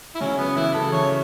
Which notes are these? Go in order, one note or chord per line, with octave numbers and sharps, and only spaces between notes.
E4
C#3 F#3 C#4
C#3 B3
E3 E4
C#3 A4
E3 C#5